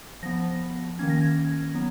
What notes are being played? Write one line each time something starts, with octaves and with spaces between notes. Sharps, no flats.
F3 B3 A#6
D#3 A#3 C#4 G#6
A#6
G#6
F#3 B3